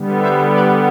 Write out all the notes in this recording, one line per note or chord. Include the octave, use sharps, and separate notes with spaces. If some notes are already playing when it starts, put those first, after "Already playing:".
Already playing: D3 G3 B3
C5 E5
B4 D5